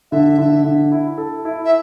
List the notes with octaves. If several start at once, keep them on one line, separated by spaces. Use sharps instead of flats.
D3 E5
D3
D3
E4
A4
E4
E5